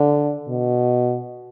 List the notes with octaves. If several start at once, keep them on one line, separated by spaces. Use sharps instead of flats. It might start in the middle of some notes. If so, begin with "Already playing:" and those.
Already playing: D3
B2